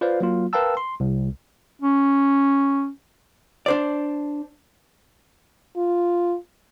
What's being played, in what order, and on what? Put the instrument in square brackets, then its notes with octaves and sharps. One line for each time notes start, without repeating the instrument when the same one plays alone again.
[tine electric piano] F4 B4 C5 D5 F5
F#3 A#3 F4
A#4 B4 F5 G5 A5 E6
C6
C2
[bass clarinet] C#4
[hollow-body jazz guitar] D4 C5 D5
[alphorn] F4